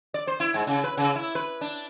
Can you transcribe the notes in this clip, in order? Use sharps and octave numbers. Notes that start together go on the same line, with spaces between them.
D5
C5
E4
G#2
C#3
B4
C#3
E4
B4
D4